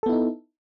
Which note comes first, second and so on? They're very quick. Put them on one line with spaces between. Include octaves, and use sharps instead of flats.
A4 B3 E4 D#4